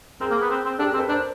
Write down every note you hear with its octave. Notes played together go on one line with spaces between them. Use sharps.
C4 G#4 A#4
A#3
B3
C4
C4
D4 G4 A4
G#4 A#4
C4
A4 B4
D4 A#4 C5